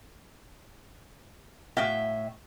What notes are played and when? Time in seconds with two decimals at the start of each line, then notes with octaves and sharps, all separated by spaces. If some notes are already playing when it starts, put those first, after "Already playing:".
1.77 A2 F#4 E5 F5 G5